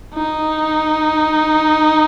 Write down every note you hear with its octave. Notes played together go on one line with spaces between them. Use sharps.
D#4